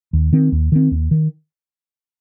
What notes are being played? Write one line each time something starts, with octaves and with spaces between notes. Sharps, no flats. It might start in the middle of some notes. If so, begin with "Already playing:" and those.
D#2
D#3 C4
D#2
D#3 C4
D#2
D#3